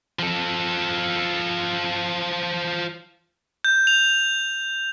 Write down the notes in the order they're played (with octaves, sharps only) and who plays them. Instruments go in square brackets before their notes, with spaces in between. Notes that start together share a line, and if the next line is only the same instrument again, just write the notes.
[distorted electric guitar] F3 A4
[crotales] G6
F7